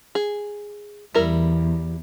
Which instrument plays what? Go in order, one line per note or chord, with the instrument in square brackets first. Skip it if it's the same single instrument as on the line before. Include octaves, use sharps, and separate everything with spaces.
[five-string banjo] G#4
[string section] E2 [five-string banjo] G3 E4 A#4